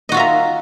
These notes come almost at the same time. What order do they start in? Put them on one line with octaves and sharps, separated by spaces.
D#5 F#4 F4 E5 A#5